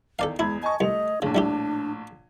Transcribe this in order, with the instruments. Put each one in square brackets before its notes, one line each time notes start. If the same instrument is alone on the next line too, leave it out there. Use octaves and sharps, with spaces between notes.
[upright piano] E2 D#3 [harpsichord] A4 D5 F5
[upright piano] E2 B5 G#6 [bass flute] G#3 [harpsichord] E4
[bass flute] D#5 [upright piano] G#5 A5 C#6
[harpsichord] C2 [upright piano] A3 F7 [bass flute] D#5
[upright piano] A#1 A2 [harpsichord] C#3 [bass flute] D4
[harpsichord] G3 E4 G4